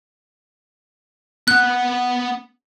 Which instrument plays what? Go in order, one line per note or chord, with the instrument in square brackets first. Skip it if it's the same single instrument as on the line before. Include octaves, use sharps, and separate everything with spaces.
[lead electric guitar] B3 F#5 [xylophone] F#6